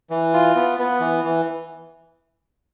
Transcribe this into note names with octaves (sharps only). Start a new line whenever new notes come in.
E3
F4
B3
B3
E3
E3